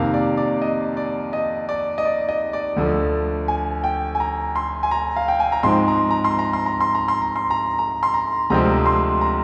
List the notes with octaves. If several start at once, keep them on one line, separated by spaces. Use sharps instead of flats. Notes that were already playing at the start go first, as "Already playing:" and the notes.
Already playing: F2 C3 D#3 A#3 F5
D5
D5
D#5
D5
D#5
D5
D#5
D5
D#5
D5
D2 D3 F3
G#5
G5
G#5
A#5
C6
G#5
A#5
F5
G5
G#5
A#5
G#2 F3 G#3 C4 C6
A#5
A#5
C6
A#5
C6
A#5
C6
A#5
C6
A#5
C6
A#5
A#5
C6
A#5
D2 C3 F3 G#3 C4 A#5
C6
A#5